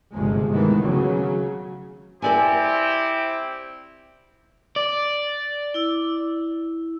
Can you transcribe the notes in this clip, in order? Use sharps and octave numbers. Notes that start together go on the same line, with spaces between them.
G1 C3 F3 G#3
C3 D#3 E3 G#3 A3 B3
C#3 F#3
C4 E4 G4 A4 D5 G#5
D5
E4 E6